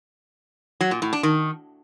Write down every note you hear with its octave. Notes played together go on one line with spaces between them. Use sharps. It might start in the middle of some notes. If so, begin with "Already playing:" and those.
F#3
A#2
A2
D4
D#3